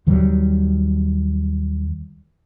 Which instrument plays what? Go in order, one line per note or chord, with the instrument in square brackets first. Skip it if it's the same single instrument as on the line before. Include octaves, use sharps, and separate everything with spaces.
[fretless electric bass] D#2 D#3 F#3 G3